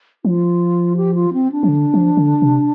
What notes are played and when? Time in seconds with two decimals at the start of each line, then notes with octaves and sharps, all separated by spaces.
0.25 F3 F4
0.96 G4
1.15 F4
1.33 C4
1.52 D4
1.63 F3
1.69 D3
1.94 F3
2.17 D3
2.42 C3